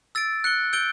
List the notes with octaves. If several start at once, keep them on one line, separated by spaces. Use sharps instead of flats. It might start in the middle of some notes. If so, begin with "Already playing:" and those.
E6 A6 D7
F#6 C#7 G7
E6 G6 D7 G7